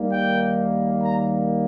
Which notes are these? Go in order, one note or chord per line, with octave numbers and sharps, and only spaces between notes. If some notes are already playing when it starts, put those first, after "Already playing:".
Already playing: D#2 D#3 G3 A#3
G5
A#5